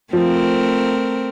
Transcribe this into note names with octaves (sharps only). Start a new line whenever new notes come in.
F3 A3 C4 A#4